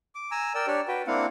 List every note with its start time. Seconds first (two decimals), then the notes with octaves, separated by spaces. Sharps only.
0.15 D6
0.31 G#5 A#5 E6
0.55 A#4 D5 G5 E6
0.67 D4 G4 C#5 D5
0.88 F#4 B4 G5
1.07 A#3 C4 D4 E4 F5 F#5